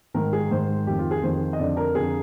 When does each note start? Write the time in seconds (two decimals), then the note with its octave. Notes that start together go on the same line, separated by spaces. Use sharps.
0.14 G#2 D#3 A#4
0.33 G#4
0.51 G#2 D#3 C5
0.87 F2 D#3 G4
0.99 F4
1.11 G#4
1.23 F2 D#3 C5
1.53 D#5
1.59 F2 D3 D5
1.77 A#4
1.95 F2 D3 G#4